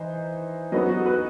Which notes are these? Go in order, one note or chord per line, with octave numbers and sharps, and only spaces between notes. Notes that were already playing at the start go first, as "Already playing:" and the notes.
Already playing: E3 D#4 C5
F#3 B3 D#4 D#5
F#4
B4